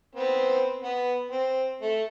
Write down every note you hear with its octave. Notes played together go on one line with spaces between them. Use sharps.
B3 C4
B3 F#5
C4
A3